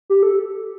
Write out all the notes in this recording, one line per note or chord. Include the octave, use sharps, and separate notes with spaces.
G4
A4